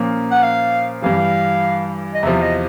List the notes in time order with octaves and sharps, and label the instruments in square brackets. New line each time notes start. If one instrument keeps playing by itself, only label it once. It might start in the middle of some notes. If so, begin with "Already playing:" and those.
Already playing: [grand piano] A#2 F3 A#3 C#4
[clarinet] F#5
F5
[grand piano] G2 E3 G3 [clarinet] F5
[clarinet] D#5
[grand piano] E2 C3 F3 [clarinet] E5
[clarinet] D#5